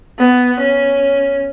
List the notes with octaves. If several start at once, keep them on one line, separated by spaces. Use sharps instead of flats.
B3
C#4